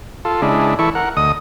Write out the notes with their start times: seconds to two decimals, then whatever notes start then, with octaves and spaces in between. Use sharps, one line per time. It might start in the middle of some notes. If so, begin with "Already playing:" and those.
0.25 F4 A4
0.42 C#3 G#3 D4 E4
0.79 E3 E4 A4 C#6
0.95 A#4 F#5
1.17 D2 D#5 D#6